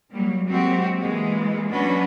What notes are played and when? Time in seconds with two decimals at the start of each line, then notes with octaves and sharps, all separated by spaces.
0.11 F#3 G3 A#3
0.48 F#3 G#3 A#3 C4 F#4 G4
1.02 E3 G#3 A#3
1.71 F#3 C#4 D4 F#4 B4